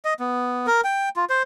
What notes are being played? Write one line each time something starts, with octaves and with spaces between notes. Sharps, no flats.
D#5
B3
A#4
G5
F4
C5